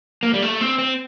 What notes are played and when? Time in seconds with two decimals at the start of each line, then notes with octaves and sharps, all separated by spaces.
0.23 A#3
0.34 G3
0.42 A3
0.61 C4
0.78 C4